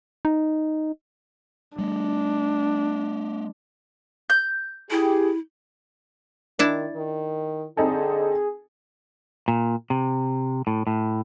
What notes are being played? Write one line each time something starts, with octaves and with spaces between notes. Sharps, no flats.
D#4
G3 A3 D4
G6
E4 G4 G#4
D#3 D4 E4 A5
D#3
D3 C4 D#4 G#4 A4
A#2
C3
A2
A2